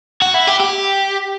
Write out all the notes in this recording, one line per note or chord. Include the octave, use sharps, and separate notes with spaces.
F#4
E4
G4
G4